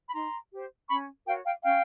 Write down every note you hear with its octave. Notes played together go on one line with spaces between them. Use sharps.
B5
D#4 A#5 C6
G4 C5
C#4 B5 C#6
F#4 A#4 C#5 F5 G5
F5 G5
C#4 F5 G5